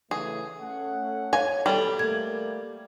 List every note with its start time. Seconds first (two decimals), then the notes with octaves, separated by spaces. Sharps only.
0.11 C#3 E3 A3 G#4
0.61 A3 C#4 F#5
1.33 C#5 F5 G#5
1.66 B2 D#3 G3 D#4 A4 G5
1.99 A3 A#3 G#6